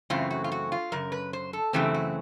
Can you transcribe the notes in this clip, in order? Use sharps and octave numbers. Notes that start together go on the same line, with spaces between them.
F#2 C#3 E3 A3 C4 F4
F#4
F4
F#4
F4
F#2 C#3 A#4
B4
C5
A4
F#2 C#3 E3 A3 C4 G4
F#4